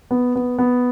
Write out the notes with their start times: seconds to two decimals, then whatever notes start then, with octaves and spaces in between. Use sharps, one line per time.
0.11 B3
0.36 B3
0.59 B3